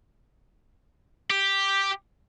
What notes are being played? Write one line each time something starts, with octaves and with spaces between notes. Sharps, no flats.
G4